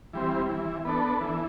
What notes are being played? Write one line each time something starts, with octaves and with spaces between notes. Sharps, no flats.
E3 G3 C4
E3
B3 D4 A4
E3